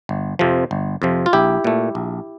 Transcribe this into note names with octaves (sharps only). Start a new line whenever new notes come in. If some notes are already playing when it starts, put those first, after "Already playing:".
G1
F2 C3 F3
G1
F2 C3 F3
F4
A#1 E4 G4
A#2 A3
A#1